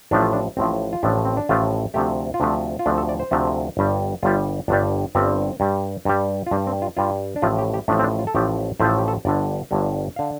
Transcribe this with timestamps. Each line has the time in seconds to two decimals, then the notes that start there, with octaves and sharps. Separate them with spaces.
0.11 A1 A2 F3 A3 D4
0.22 F4
0.33 D4
0.57 A1 A2 F3 A3 C4
0.93 F4
1.03 A1 A2 F3 A3 D4
1.25 C4
1.37 D4
1.49 A1 A2 F3 A3 F4
1.94 D2 C3 F3 A3 G4
2.34 F4
2.40 D2 C3 F3 A3 D4
2.79 F4
2.86 D2 C3 F3 A3 D4
2.98 A4
3.09 D5
3.20 C5
3.31 D2 C3 F3 A3
3.77 G1 G2 G3
4.23 G1 G2 G3 F4
4.68 G1 G2 G3 D4
5.15 G1 G2 G3 C4
5.60 G2 G3
6.05 G2 G3
6.47 F4
6.51 G2 G3 D4
6.67 C4
6.82 F4
6.97 G2 G3 F4
7.36 D4
7.42 A1 A2 F3 A3 F4
7.59 G4
7.74 G4
7.88 A1 A2 F3 A3 D4
7.99 C4
8.03 D4
8.19 F4
8.27 A4
8.35 A1 A2 F3 A3 G4
8.80 A1 A2 F3 A3 C5
8.89 A4
8.99 G4
9.08 A4
9.25 G1 G2 D3 D5
9.71 G1 G2 D3
10.16 D3 F5